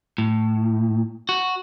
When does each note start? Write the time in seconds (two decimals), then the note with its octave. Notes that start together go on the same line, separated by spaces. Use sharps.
0.18 A2
1.29 F#4